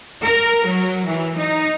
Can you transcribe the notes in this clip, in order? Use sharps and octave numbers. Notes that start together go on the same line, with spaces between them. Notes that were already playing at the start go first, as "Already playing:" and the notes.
A#4
F#3
E3
D#4